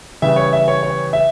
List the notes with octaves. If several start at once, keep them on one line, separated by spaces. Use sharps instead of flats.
C#3 E3 G3 E5
C#5
E5
C#5
C#5
E5